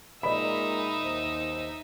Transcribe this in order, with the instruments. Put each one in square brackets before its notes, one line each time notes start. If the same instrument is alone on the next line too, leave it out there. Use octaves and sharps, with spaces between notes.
[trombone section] A#2 G#3 A#4 [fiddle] D#4 E5 [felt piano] D#5 B5
[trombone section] D#2 C5